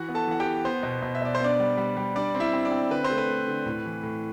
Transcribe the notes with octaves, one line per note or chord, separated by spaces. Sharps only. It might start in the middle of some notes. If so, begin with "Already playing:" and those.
Already playing: E3 F#4 F#5
B3
A4 A5
E3 F#5
G4 G5
B3
B3 C5
B2
B2
E5
B2 D5
C5
B3 D4 D5
G3
G3
G3
G3 D4 D5
C4
E4 E5
C4
D4 D5
C4
D3 B4
C5
A3
B4
A3
D3
A2
E3
A2